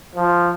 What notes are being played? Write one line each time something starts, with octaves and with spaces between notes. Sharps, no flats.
F3